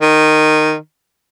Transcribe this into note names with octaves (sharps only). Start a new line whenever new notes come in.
D#3